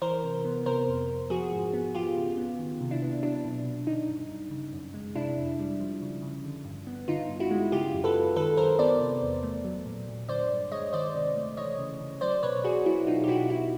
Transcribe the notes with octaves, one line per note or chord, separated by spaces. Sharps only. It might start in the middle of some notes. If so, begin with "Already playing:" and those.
E3 A#4 C5
C3
B3
C3 A#4 C5
F2
F2
F3 F#4 G#4
G#2
B3
F3 F4 G4
C#3
B3
D#3
C3
D4 E4
B3
F#3 D4
B2
B2
D3 D#4
G2
G2
C#3
F#2
G#3
C3 D4 E4
F2
G3
F3
C#3
C#3
D3
G2
B3
D3 D#4 F4
G2
E4 F#4
G#3
C#3 F4 G4
F#2
A4 B4
G#3
D#3 A4 B4
F#2 A#4 C5
B3 C5 D5
C3
E2
A3
F#3
A#2
A#2
D3 C5 D5
G2
G#3 C#5 D#5
D#3 C5 D5
C3
A3
E3 C#5 D#5
C#3
C#3
F#3 C5 D5
B2 B4 C#5
B2 F#4 G#4
F#3 E4 F#4
B2 D#4 F4
G4
B2 E4 F#4
B2 E4 F#4